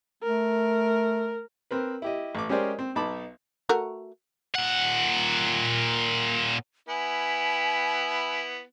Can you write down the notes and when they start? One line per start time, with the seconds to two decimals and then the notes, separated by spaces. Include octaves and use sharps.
0.23 A3 A#4
1.71 C4 A#4 B4
2.02 E4 G4 D#5
2.35 A1 D6
2.49 G#3 C#4 G4 A#4 C5 D5
2.79 C4
2.95 B1 D#4 A5 B5 D6
3.69 A3 F#4 A#4
4.55 A#2 F#5
6.89 B3 E4 G#5